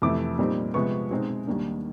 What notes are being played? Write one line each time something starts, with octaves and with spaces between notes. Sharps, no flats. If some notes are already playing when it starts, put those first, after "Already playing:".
F2 C3 E3 A3 D6
A#2 G3 C4 D#4
C3 F3 G#3 B3 C#6
B2 G#3 C4 D#4
D#2 D#3 G3 A#3 D4